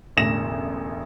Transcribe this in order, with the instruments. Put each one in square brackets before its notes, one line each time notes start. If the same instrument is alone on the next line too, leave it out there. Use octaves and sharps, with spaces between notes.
[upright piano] E1 A1 D2 A#6 E7